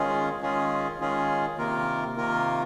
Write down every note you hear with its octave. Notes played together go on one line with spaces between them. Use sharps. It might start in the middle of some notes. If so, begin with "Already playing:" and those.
Already playing: D#3 G#3 C#4 F4 G#4
D#3 G#3 C#4 F4 G#4
D#3 G#3 C#4 F4 G#4
C3 D#3 A#3 F4 A#4
C3 D#3 A#3 F4 A#4